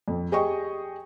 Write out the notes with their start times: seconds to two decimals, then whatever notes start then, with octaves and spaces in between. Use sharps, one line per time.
0.08 F2
0.32 G4 G#4 D#5 G5 C#6